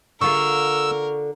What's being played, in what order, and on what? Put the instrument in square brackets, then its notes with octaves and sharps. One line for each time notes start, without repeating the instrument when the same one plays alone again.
[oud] D3 F4 G#4 [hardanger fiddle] A#4 [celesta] C#6 [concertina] E6